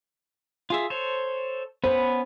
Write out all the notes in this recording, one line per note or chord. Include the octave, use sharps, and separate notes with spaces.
F4 G#4 E5
A4 C5 C#5
B3 C#4 B4 C5